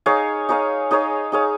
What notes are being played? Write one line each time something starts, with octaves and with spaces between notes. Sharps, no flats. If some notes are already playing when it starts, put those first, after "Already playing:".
D#4 G#4 C#5 F5
D#4 G#4 C#5 F5
D#4 G#4 C#5 F5
D#4 G#4 C#5 F5